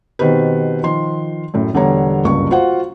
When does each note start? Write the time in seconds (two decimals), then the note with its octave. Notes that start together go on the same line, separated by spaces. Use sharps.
0.19 B2 D#3 C4 G4 B4
0.83 D#3 F3 C6
1.54 F#2 A2
1.74 E1 D3 G3 B3 C#5 A#5
2.24 F#1 C#2 G2 C#6
2.51 F4 F#4 C5 F5 F#5